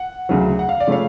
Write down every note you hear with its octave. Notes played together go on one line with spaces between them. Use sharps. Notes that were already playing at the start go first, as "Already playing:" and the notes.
Already playing: F#5
D2 C#3 F#3
F#5
F5
D5
C#3 F3 A3 C#5 F5